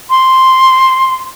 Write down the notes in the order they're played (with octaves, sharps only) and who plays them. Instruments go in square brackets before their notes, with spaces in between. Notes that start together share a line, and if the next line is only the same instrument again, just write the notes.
[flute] C6